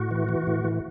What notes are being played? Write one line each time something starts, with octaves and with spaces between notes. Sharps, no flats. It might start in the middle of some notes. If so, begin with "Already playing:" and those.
Already playing: A2 F#4
E3
E3
A2
E3